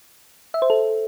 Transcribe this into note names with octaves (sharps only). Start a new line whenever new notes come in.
E5
C5
A4